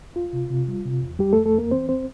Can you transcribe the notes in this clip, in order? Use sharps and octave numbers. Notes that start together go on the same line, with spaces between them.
E2 F4
C3
C3
G3
C3
E2
F2 G3 G4
F2 A3 A4
A3 A4
F2 A#3 A#4
E3 C4 C5
F2 C4 C5